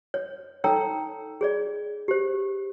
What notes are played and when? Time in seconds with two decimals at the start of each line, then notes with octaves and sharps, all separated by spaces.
0.14 C#5
0.64 D#4 A4 C#5 G5 A#5 E6
1.41 G#4 C#5 D5
2.08 G4 C5